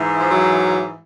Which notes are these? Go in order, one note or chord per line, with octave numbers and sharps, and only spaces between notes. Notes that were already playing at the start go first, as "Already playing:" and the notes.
Already playing: G#2 E3
F3
F#3